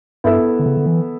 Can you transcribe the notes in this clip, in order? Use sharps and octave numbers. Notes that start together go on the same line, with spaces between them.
G2 B3 E4 A4 E5
D3
C#3
D3
E3